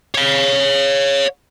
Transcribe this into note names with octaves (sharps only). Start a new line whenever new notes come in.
C#5 F5